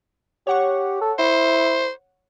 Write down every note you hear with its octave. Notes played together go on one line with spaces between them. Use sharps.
G4 C#5 F#5 C#6
A4
E4 C5